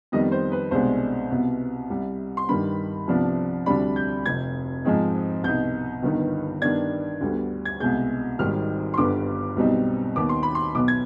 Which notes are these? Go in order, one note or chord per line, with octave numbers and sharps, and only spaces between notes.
F2 D#3 G3 B3 D#5
C5
B4
C2 B2 G#3 D4 C5
C2 B2 B3
C2 C3 G3
C6
G2 D#3 G3 B5
C2 C3 F3 B3 D4
D2 C3 G3 D4 B5
G6
F1 F2 C3 G#6
G#2 F3 G#3 C4 D#4
C2 B2 B3 D#4 G6
G1 G2 D#3 B3 D#4
G2 D#3 B3 D4 G#6
D2 D3 G3 B3
G#6
C2 B2 G#3 G6
G#1 G#2 D#3 G3 F6
C6
G1 G2 D3 G3 B3 D6
B1 B2 G3 C4 D#4
D#2 D#3 B3 D6
C6
B5
C6
B1 B2 B3 D6
G#6